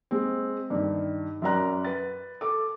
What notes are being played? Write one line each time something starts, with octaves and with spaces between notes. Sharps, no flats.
G#3 C4
G2 D#3
F#2 F#3 A#4 D5 A#5 F#6
B4 A6
A4 D6